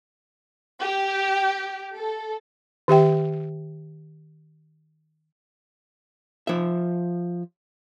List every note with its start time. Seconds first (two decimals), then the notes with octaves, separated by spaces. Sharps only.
0.81 G4
1.94 A4
2.88 D#3 G4 E5 G5
6.47 F3 E5